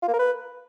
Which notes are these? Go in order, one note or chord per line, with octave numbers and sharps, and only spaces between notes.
F4
A#3
A#4
B4